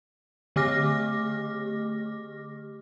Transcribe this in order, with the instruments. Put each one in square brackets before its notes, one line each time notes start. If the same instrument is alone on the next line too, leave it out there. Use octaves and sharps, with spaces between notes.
[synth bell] D3 A3 G4 D6 F6 A#6